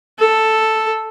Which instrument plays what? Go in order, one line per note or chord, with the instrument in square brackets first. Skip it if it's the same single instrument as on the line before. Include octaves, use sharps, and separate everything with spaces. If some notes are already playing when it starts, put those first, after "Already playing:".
[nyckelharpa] A4